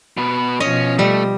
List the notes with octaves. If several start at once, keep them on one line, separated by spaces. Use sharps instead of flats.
B2 B4
B2 F3 C#4 D#5
G3 A3